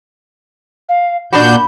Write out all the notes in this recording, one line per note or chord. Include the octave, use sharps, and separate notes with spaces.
F5
A#2 D4 F#4 B5 G6